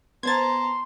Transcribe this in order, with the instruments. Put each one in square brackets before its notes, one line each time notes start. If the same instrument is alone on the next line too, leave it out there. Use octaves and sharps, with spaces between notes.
[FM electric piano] B3 C5 [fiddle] A5 A#5 [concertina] C6 [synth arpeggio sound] G#6 A6